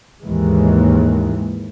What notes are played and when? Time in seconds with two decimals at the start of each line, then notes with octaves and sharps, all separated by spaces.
0.22 D#2 G#2 E3 G#3